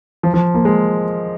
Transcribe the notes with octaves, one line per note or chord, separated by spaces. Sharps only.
F3
F3
A#3
G#3